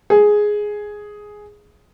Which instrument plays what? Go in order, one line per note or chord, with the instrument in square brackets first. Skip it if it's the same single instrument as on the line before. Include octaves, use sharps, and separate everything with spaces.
[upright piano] G#4